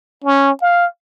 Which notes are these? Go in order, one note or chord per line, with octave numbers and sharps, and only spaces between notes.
C#4
F5